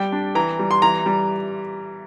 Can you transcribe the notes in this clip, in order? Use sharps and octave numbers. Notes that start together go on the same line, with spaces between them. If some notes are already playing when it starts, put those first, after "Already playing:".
Already playing: G3 G5
D4
E3 A#5
G3
C6
E3 A#5
G3